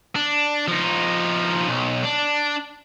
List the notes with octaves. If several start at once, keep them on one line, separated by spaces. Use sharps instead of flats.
D4
F3 D#4
B1
D4